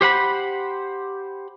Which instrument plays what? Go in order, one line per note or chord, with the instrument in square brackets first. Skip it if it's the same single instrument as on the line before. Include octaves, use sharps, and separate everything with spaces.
[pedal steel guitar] G4 C5 F#5 B5